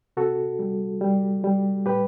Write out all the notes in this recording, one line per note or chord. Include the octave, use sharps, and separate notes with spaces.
C3 F#4 A4
G3
G3
G3
A2 G4 B4